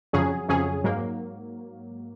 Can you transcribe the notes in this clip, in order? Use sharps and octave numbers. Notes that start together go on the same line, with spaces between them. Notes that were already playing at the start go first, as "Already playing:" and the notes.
F2 C#3 F#3 C#4 G#4
F2 C#3 F#3 C#4 G#4
G#2 F#3 A#3